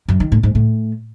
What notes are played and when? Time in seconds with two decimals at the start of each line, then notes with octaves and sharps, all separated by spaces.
0.08 F#2
0.20 D#3
0.32 A2
0.43 G#2
0.55 A2